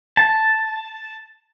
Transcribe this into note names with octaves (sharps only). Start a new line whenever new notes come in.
A5